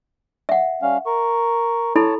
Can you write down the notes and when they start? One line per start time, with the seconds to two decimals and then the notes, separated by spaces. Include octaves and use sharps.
0.49 E5 F#5
0.82 G3 C#4 F5
1.06 A#4 C#6
1.96 E4 A4 C#5 A5 B5